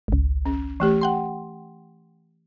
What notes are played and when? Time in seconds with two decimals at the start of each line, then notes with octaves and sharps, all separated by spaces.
0.08 G#1 C#2
0.46 C#4
0.80 E3 A3 G4
1.01 F#5 G5 C6